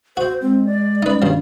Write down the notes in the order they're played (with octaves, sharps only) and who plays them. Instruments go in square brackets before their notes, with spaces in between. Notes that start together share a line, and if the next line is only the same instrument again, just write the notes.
[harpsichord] F#4 [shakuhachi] C5
[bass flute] G#3 [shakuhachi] C4
[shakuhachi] D5
[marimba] G3 C#4 [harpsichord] D#4 B4
[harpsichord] G2 F3 [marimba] D#3 D4